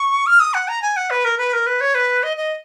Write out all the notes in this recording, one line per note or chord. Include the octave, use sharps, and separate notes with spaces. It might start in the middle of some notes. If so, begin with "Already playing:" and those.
Already playing: C#6
F6
D#6
F#5
A#5
G#5
F#5
B4
A#4
B4
A#4
B4
C#5
B4
D#5
D#5